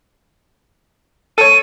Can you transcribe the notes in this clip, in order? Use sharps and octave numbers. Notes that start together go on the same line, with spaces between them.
A4 C#5 D#7